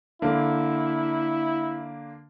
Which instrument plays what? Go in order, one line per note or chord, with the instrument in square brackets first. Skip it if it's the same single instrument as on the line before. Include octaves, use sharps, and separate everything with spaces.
[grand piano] D3 A#3 [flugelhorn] E4